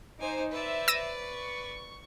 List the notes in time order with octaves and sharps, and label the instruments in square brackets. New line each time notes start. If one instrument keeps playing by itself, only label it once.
[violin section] D#4 C5 [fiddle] G#5 D6
[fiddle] B4 D5 [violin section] C5 E5
[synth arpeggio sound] E6 A#6 D#7
[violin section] C#6